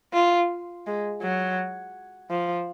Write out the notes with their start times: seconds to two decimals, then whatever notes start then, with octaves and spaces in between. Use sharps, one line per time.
0.13 F4
0.87 G#3
1.22 F#3
2.31 F3